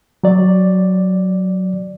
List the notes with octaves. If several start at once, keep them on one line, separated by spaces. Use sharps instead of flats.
F#3 D5